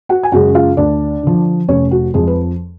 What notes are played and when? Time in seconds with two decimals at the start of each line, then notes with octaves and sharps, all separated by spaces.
0.09 F#4 F#5
0.23 G#5
0.32 F#2 C#3 G#3 F#4 F#5
0.55 F4 F5
0.77 D2 D4 D5
1.23 D3 F3
1.68 F1 C#4 C#5
1.91 F#4
2.14 F2 F3 G#3 G#4
2.27 B4